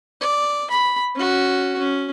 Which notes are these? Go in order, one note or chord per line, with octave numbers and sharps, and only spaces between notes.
D5
B5
C#4 F#4
C#4